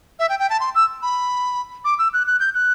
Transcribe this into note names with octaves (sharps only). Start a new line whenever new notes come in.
E5
G5
G5
A5
C6
E6
B5
D6
E6
F#6
F#6
G6
F#6